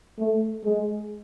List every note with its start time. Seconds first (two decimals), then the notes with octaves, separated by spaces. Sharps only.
0.19 A3
0.65 G#3